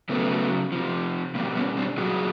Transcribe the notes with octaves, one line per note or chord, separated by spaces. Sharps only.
C#3 F#3 A3 B3
C3 F3
B2 G3 A#3 C4
B3 C#4
C4 D4
A#2 F#3 F#4 G#4